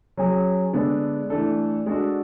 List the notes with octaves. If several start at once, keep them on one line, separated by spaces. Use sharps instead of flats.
F#3 C#4 G#4
D3 G#3 B3 D4 A4
E3 A3 D4 A4
G#3 D4 F#4 A4